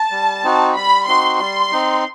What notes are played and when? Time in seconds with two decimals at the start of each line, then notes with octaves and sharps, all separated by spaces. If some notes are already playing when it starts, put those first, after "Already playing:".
Already playing: A5
0.11 G3
0.43 C4 D#4 F#4
0.75 G3 B5
1.07 C4 D#4 F#4 C6
1.39 G3 C6
1.72 C4 D#4